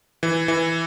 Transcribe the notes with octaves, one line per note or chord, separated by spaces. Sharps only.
E3
E3